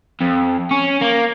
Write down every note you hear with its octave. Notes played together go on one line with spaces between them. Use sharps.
F2
C#4
A#3